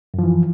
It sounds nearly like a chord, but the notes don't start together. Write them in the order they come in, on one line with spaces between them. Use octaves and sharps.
F#2 F3 E3